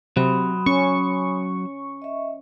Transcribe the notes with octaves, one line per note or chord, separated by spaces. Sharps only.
C3 F#3 B5 C6 D#6
C#4 C#6
D#5 E5